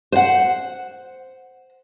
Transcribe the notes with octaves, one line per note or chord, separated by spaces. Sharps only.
C5 F#5